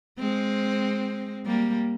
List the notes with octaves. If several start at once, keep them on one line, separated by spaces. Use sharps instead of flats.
G#3 C4
G3 A#3